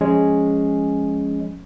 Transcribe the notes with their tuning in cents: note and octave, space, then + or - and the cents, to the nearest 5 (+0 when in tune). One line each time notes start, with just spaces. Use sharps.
F3 +0 G#3 +0 C#4 +0